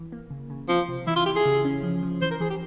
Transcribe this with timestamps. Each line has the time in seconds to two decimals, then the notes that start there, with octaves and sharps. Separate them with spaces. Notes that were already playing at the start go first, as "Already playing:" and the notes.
Already playing: E3
0.12 A#3
0.30 C#3
0.50 C#3
0.69 F3 C4
0.89 C3
1.07 E3 E4
1.16 F4
1.26 E4 G4
1.36 G#4
1.45 C#3
1.65 C#4
1.83 F3
2.03 F3
2.22 E3 C5
2.31 A#4
2.40 E3 G#4
2.50 G4